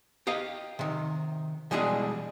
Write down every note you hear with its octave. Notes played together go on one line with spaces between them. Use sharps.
G4 D#5 F5
C3 D#3
B2 E3 G3 G#3 D4 G#4